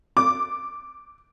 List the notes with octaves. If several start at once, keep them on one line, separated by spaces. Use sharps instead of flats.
D6